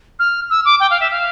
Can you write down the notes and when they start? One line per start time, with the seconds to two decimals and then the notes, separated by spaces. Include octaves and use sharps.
0.19 F6
0.50 E6
0.65 D6
0.80 G5
0.91 F5
1.00 E5
1.11 F5